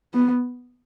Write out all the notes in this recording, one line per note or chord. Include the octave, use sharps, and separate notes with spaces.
B3